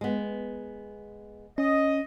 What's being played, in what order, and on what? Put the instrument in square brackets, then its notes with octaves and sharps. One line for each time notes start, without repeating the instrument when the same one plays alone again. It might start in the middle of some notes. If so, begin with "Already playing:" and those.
[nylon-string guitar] G#3 B3
[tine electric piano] C#4 [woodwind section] D#5